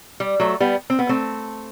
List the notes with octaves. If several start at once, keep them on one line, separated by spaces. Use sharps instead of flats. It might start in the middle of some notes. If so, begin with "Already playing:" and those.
G3
F#3 A3
G3 B3
C4
B3
A3 C4